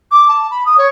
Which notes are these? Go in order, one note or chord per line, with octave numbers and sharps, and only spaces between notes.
D6
A5
B5
D#6
C#5